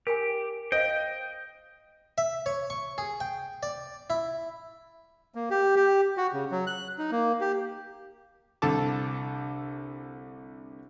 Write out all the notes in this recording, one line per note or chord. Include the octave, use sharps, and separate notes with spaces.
G4 A#4 G5 G#5
C5 D#5 F5 G5
E5
C#5
C#6
G#4
G5
D5
E4
A#3
G4
G4
F#4
C#3
F#3
F#6
D#4
A#3
G4
C2 D3 A4 A5 D6